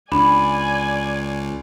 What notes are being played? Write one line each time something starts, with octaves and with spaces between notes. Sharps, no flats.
C#2 D4 D5 G#5 B5